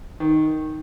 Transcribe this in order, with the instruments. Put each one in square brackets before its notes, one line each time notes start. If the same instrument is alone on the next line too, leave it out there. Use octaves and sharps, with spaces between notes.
[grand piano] D#3